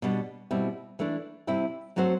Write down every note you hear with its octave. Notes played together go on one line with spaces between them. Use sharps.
B2 G3 D4
B2 G3 C4 E4
E3 A3 D4
C3 G3 C4 E4
F#3 A3 C4 F#4 C5